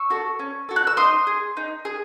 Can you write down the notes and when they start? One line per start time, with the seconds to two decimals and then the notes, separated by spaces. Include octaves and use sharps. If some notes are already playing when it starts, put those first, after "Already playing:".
Already playing: C#6 E6
0.10 F#4 A4
0.39 C#4
0.69 F#4 A4
0.76 F#6
0.87 E6
0.97 D#4 C6 D#6
1.27 G#4
1.57 D#4
1.85 G#4